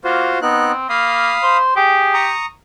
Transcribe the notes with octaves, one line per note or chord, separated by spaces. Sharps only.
A#3 F4 F#4 C5
B3 C4 D#4 F#6
A#3 F5 B5 D#6
C5
G4 G#4
A#5 C#6 D#6